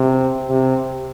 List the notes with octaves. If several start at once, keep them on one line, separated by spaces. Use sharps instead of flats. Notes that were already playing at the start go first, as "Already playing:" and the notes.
Already playing: C3
C3